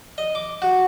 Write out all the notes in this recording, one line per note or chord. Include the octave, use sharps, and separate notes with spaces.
D#5
D6
F#4